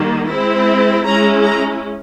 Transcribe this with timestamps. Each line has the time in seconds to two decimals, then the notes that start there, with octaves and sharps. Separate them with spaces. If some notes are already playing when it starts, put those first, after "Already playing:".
Already playing: D#3 G3 A#3
0.29 G#3 C4 E4
1.05 G#3 C#4 E4 A#5
1.42 A#5